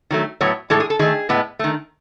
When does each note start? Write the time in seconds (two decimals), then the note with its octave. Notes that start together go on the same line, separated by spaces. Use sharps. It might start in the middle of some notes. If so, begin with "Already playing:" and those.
0.10 D#3 F#3 A3
0.41 A2 F#3 B3 C#5
0.70 A2 E3 G#3 A4
0.80 G#4
0.90 A4
0.99 D#3 A3 G#4
1.29 A2 G#3 B3
1.59 D#3 A3